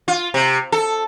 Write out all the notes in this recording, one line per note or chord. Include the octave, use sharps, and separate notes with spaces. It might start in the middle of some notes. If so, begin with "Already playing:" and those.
F4
C3
A4